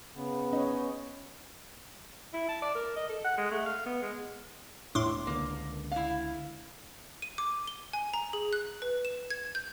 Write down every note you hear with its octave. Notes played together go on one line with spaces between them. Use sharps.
C#3 B3
C#4 D#4 C#5
E4
A5
D5
A#4
D#5
A4
F#5
G#3
A3
F5
B3
G#3
E1 A2 D4 C6 D6
C#2 D3 A#3
E4 F5
D#7
D6
G7
G#5
A#5
G#4
F#6
B4
E7
G#6
G6